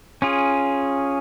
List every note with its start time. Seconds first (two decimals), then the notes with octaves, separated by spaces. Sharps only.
0.22 C#4 F4 G#4